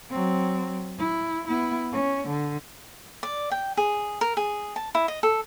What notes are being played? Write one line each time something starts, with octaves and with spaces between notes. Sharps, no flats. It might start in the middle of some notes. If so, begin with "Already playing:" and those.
F#3 C4
E4
B3 E4
C#4
D3
D5
G5
G#4
A#4
G#4
A5
E4
D#5
A4